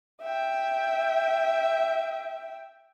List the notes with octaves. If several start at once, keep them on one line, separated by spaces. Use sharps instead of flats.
E5 G5